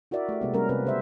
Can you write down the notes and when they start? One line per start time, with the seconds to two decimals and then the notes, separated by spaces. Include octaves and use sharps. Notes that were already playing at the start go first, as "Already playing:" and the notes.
0.11 E4 F#4 A#4 D5 E5
0.29 A3 G4
0.41 C3 G#3 B3
0.54 G3 A3 A#3 C#4 G#4 A#4
0.69 C3 C4 A#4 B4
0.85 C#3 C5 E5